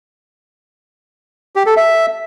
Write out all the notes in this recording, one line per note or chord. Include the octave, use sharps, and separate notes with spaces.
G4
A4
E5